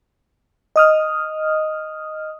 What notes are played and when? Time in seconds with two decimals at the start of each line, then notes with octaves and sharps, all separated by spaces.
0.76 D#5 D#6 F6